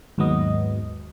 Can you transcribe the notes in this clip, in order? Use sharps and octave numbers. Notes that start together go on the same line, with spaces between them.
D#2 G#2 F#3 B3 D#5